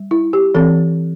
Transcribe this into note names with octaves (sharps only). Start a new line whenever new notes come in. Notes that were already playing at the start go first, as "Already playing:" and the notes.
Already playing: G3
E4
G4
E3 C4 A4